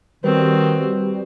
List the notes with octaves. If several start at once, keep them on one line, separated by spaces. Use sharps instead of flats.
D#3 G3 C4 F#4 B4